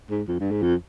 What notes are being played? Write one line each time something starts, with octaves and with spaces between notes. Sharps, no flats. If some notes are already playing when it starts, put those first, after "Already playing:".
G#2
F2
G2
G#2
F2